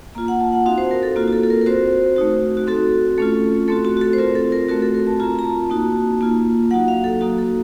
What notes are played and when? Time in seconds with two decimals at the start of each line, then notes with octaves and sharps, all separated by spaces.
0.15 A#3 F4 A#5
0.28 F#5
0.40 A5
0.52 F#5
0.65 C4 D#4 F#4 F5
0.78 C5
0.91 A#4
1.03 A4
1.16 A#3 F4 F#4
1.28 F#4
1.32 A4
1.43 A4
1.50 A#4
1.61 A#4
1.66 C4 F#4 C5
2.16 A3 D#4 F#4
2.57 F#4
2.67 C4 F#4 A4
3.18 A3 C#4 F4 A4
3.68 A3 C4 F#4 A4
3.85 F#4
3.97 F#4
4.01 A4
4.13 C5
4.18 C4 F4 A#4
4.35 A4
4.52 A#4
4.68 A3 C4 F#4 A#4
4.82 A4
4.94 A#4
5.07 A5
5.20 C4 F4 A#5
5.39 A#5
5.44 A5
5.70 A#3 D#4 F#4
6.21 A#3 F4
6.71 F#3 A#3 D#4 F#4 F#5
6.88 F5
7.04 A4
7.21 A#3 D#4 F#4
7.38 A4